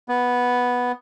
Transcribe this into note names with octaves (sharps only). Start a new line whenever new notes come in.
B3